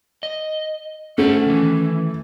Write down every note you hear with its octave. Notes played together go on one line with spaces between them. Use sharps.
D#5
A3 C#4 F#4 C5 F#5
D#3 E3